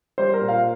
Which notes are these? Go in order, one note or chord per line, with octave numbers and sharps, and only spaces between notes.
G3 C5
A#4
A#2
F5